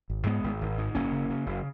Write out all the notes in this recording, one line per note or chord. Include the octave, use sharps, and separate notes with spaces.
G#1
G#2 G#3 B3
G#1
G#1
G#2
F#1 A#3 C#4
C#3
C#3
F#1